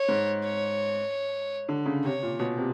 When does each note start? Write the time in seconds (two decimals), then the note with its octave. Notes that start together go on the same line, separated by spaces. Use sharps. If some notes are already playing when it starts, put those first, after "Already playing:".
Already playing: C#5
0.09 G#2
0.44 C#5
1.69 D3
1.86 C#3
2.04 C3 C#5
2.22 A#2
2.39 B2
2.58 C3